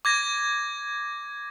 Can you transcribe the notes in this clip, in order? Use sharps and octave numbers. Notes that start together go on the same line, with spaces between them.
D6 G#6 A#6